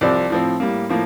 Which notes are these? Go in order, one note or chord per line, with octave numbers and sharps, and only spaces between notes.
C2 C3 F3 C4 D5
A2 F3 C4
A2 G3 A#3
A2 F3 A#3